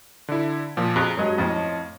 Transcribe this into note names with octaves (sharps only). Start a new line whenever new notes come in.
D3 E4
A#2 F3
F2 G#4 A#5 F#6
G2 F#3 G#3 C#5 D#5
F2 A2 C4